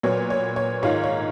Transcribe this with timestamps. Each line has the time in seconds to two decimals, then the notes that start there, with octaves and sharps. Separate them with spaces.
0.03 A#2 F#3 B3 C#5
0.30 C#5
0.56 C#5
0.83 G#2 D#3 A#3 F4 C#5
1.04 C#5